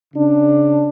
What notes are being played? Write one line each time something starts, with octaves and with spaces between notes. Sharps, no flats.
C#3 D4